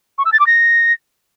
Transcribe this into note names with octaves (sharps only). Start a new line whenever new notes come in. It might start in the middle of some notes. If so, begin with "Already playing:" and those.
C#6
E6
A6
D6
A#6